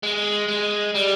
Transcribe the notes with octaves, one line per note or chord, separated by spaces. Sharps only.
G#3
G#3
G3